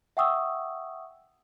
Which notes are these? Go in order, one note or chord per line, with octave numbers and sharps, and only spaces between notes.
E5 F#5 G5 C#6 D#6 E6